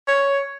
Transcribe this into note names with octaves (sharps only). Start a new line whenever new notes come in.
C#5